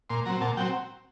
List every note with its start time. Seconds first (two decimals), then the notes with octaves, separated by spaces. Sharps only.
0.10 A#2 C6
0.25 F#3 C4 A#5
0.41 A#2 A5
0.57 F#3 C4 G5